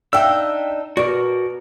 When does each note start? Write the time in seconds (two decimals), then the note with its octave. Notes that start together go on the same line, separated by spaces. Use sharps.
0.13 D4 D#4 E5 F5 G5 E6
0.97 B2 F#4 A#4 D5